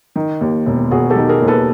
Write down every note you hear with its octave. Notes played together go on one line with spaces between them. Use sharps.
D#3
D#2
E1
E1 F#4 G#4
G4 A4
D#3
G#4 A#4
D#2
A4 B4